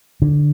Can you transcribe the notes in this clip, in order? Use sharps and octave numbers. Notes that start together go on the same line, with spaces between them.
D3